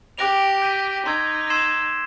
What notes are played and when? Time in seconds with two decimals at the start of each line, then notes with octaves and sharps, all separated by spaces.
0.18 G4 D6 F#6 A#6 D7 F7
0.62 G6 B6 D#7 G7
1.06 D#4 C6 E6 G#6
1.50 C6 E6 G#6 C7 E7